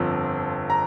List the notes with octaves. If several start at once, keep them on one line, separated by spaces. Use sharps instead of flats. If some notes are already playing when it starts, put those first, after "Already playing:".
Already playing: G1 F2 F3
A#5